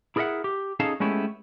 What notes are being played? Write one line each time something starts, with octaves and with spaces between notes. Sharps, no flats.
E4 G#4 A#4 D5 E5 F#5
G4
C#4 D#4 G#4 A4 F5 A5
G#3 A3 B3 C#4 E4 G4